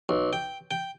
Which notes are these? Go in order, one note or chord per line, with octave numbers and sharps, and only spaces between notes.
B1
G5
G5